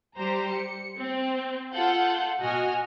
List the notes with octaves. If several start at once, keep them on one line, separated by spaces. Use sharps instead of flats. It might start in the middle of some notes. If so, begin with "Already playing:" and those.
G3 G4 C5 A#5
C#7
C4
F4 A4 F#5 G6
B2 F#4 D#5 G#5 F6